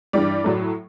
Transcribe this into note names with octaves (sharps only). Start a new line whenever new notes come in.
G2 E3 G3 D5
A2 F#3 A3